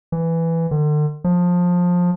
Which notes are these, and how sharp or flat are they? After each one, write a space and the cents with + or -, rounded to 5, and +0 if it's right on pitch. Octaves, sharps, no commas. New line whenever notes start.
E3 +5
D3 +40
F3 +20